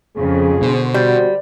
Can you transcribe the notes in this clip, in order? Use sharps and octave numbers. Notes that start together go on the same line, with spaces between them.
F2 C#3 G#4
B2 D3 C5
G3 F#4